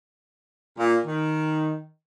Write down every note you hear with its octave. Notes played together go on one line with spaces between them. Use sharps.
A#2
D#3